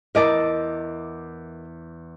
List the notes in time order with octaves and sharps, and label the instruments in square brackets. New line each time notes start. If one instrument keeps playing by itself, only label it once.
[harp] E2 E4 D6 [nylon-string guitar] A#4 D#5 A5